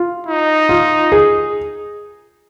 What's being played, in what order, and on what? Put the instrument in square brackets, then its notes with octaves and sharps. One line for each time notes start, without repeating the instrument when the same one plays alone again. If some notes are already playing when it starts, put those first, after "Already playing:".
Already playing: [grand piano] F4
[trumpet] D#4
[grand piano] F4
G#4